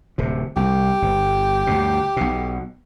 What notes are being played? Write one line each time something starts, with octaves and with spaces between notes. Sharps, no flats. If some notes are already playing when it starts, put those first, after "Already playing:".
D1 C3
C2 G4
G1
D2 G2 B2
B1 B2